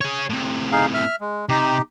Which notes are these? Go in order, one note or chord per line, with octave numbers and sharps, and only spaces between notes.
G#4 C#5
A2 C3
D#4 G#4 F5
E5 F6
G#3
C3 D#4 G4